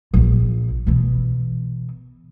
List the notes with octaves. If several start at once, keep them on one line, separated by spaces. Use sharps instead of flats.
A#1 A#2
B2 E3